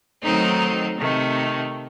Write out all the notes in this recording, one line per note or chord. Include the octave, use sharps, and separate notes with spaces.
D#3 F#3 A3 C4 D#4
C3 D#3 A3 D#4